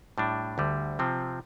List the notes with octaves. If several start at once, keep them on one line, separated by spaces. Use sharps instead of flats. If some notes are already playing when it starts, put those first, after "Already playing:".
A2 G3 D4
D2 D3 G3
C3 F3 C4